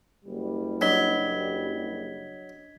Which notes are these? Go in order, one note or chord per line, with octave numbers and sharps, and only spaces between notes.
F#1 G3
F#3 D4 D#5 G#6 B6 G7